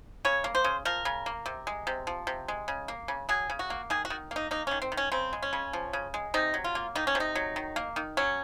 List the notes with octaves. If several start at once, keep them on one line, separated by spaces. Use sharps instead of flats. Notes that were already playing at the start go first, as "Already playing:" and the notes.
C#3 C#5
A#3
C5
C#3
F3 A#4
C#3
A#3
C3
G#3
C3
F3
C3
G#3
C#3
A#3
C#3
F#3 G#4
C#3
F#4
A#3
D#3 G#4
F#4
D#3
A#3 D#4
A#3 D#4
D#3 C#4
C4
D#3
C#4
C#3 C4
G#3
C#4
C#3
F3
C#3
G#3
C3 D#4
F#3
F4
A#3
D#3 D#4
C#4
C3
D#4
F#3
D#3
A#3
D#3
F#3 C#4